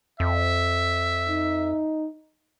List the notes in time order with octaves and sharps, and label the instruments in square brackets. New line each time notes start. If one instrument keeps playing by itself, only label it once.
[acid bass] F2 [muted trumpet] E5
[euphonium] D#4